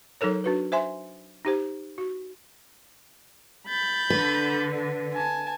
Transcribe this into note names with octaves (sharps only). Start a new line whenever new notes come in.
F#3 D#4 A4 A#4 C#5
D4 F#4 B4
C5 E5 G#5 C6
D#4 G4 C5
F#4
B5 G6 A6
D3 B4
G#5 A5